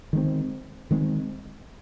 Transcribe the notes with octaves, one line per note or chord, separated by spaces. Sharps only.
D#3 G#3 C4
D#3 G#3 C4